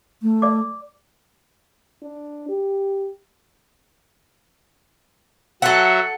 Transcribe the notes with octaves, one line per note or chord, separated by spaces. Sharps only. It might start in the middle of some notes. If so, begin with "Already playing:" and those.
A3
D5 D6
D4
G4
F#3 A4 E5 F#5